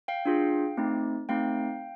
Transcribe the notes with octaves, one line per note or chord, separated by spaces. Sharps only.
F5 G5
D4 F4 G#4
A3 C4 D#4
A3 C4 D#4 F5 G5